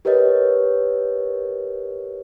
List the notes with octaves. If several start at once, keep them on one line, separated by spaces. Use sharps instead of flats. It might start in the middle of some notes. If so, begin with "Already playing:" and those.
G4 A#4 B4 C#5 D#5